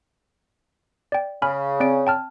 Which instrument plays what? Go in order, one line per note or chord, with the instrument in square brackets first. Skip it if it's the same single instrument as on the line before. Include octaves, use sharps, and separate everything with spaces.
[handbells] D5 G5
[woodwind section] C#3 [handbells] G#5 B5 F6
[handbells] C4 D5 D7
G5 A5 F6